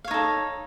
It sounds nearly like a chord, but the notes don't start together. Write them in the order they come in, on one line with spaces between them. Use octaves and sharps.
F5 C#5 D#4 A4